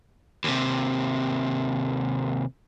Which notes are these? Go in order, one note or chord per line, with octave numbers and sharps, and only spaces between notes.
D#2 C3